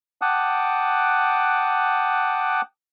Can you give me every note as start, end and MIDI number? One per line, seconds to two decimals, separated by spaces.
0.22 2.61 78
0.22 2.61 79
0.22 2.61 81
0.22 2.61 86
0.22 2.61 87
0.22 2.61 90